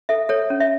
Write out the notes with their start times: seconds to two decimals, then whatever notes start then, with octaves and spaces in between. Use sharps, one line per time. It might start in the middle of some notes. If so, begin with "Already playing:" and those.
0.09 A4 E5
0.29 A4 C#5
0.50 C#4
0.60 E5